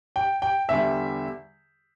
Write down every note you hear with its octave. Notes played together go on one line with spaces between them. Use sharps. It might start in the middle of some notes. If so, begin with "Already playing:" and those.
G5
G5
E2 D3 G3 E5